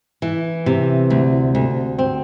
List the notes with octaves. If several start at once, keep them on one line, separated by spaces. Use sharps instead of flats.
E3
C3
D2
D2
C4